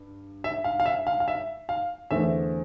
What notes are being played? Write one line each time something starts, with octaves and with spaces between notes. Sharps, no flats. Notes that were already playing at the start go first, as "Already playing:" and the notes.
Already playing: G2
E5
F5
F5
E5
F5
F5
E5
F5
E2 D3 A3 C4 E5